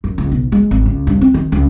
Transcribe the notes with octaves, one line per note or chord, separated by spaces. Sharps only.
F#2
C#2
B1
G#3
G#1
C#2
G2
C4
D#3
C#2